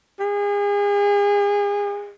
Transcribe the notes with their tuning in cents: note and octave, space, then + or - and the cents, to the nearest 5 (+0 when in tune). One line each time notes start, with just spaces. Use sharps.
G#4 -35